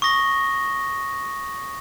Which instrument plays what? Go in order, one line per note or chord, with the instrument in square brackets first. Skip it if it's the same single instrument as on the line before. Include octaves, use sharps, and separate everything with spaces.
[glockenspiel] C#6 D#6 A#6 G7